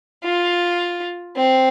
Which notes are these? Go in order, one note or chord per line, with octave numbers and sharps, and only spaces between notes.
F4
C4